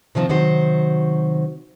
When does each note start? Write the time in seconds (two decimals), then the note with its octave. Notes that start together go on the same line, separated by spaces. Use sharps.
0.15 C3 D#3 F3 C4
0.29 C3 D#3 F#3 F#4 C5